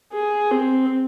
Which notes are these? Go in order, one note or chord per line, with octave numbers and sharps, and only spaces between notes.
G#4
C4